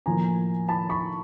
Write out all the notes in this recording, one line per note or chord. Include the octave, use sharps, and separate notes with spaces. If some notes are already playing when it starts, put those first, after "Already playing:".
A2 F3 A#3 G#5 A#5
A5 B5
B5 C#6